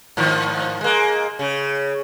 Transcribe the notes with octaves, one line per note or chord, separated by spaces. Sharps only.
G#2 D#3 F3
G#3 A#3
C#3